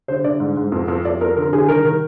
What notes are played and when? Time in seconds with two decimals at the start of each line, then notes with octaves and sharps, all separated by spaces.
0.08 D3 C5
0.24 D3 D5
0.40 G#2
0.57 G#2
0.72 F2
0.88 F2
1.05 F2 D5
1.21 F2 A#4
1.36 D3 A#4
1.53 D3 G#4
1.68 D#3 A#4
1.85 D#3